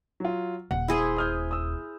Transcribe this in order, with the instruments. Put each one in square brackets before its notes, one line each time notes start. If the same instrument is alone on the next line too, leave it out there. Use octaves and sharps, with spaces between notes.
[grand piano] F#3 F4
[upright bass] D#1 [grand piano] F#5
[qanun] E4 G#4 C5
[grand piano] D#6 F6 G6
D#6 E6